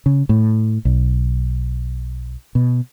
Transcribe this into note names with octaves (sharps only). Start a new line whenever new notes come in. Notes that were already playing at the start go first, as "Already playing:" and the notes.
C#3
A2
B1
B2